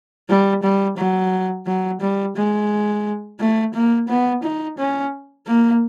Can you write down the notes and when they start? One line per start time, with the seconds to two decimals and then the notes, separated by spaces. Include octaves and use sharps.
0.29 G3
0.63 G3
0.98 F#3
1.67 F#3
2.01 G3
2.36 G#3
3.40 A3
3.74 A#3
4.08 B3
4.43 D#4
4.78 C#4
5.47 A#3